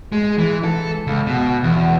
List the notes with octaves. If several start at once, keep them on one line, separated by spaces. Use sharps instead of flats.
G#3
E3
A4
C#2
B2
E2